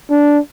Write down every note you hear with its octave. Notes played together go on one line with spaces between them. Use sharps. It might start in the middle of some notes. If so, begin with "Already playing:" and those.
D4